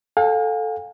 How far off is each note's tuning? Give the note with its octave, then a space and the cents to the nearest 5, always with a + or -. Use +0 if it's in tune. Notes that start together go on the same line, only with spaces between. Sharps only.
A4 +0 F5 +40 G#5 -45